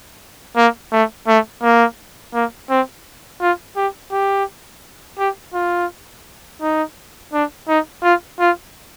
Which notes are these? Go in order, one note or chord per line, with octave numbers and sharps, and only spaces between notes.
A#3
A3
A3
A#3
A#3
C4
F4
G4
G4
G4
F4
D#4
D4
D#4
F4
F4